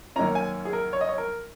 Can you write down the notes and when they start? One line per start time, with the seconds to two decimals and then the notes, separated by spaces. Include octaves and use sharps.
0.16 F#2 D#3 A#3 C#4 A#5
0.35 G#5
0.65 G#4
0.73 A#4
0.93 C#5
1.01 D#5
1.09 C#5
1.18 A#4